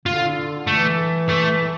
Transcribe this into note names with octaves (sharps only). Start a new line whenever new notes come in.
D3 F4
E3 A3
A3